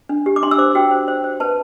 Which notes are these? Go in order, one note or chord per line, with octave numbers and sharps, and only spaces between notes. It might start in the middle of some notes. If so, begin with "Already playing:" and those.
D4
G4
D6
D4 C6
E6
C5 D6
F#4 G5
C5
C5
C5
B4 A5